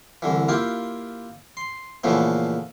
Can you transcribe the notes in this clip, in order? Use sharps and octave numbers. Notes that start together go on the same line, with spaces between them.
C2 D3 E3
A#3 E4 F4 G4
C6
A#2 C#3 E3 F3 A3 B3